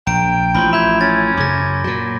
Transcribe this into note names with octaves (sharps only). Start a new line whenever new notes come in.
A#1 G5 A#5 D7
A1 F3 B5 C6
E5 B5 G6 G#6
C#4 A6
F#2 C#3 D6 A#6
A#2 F#3